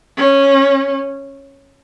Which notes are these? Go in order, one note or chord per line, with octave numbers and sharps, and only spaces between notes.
C#4